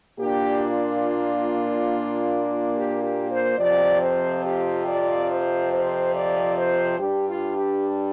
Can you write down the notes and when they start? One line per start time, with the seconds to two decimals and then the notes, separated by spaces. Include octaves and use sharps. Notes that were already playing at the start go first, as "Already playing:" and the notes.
0.19 A#2 A#3 D4 G4
0.60 F4
2.74 G4
3.01 G4
3.30 C5
3.58 F2 C3 F3 D5
4.01 C5
4.44 G4
4.86 D5
5.29 C5
5.71 C5
6.14 D5
6.56 C5
6.99 G2 G3 D4 G4
7.27 F4
7.55 G4